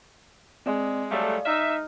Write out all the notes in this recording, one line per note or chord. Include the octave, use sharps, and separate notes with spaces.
G#3 C4 D5
F#3 G3 A3 D5 F5
D#4 E5 F6